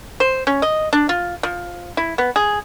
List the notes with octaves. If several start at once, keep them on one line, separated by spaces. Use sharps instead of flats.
C5
C#4
D#5
D4
F4
F3
E4
B3
G#4